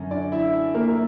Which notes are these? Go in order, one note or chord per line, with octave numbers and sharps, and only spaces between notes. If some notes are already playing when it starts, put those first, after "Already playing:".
Already playing: F#2 D3 C#4
D4 D5
E4 E5
A#3 A#4
A#4